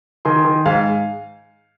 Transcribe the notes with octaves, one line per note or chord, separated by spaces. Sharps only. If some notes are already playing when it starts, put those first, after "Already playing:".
D#3 G#5 C6
D#3
G#2 F5 G#5